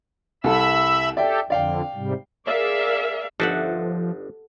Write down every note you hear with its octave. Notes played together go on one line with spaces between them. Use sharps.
C2 A4 E5 B5 E6
G4 A4 D5 E5 G5
F2 D3 D5 F5 G5
G#2 C3 G3
G#4 A#4 D5 E5 F5
G1 F3 D4 D#4 A4 E5 F#5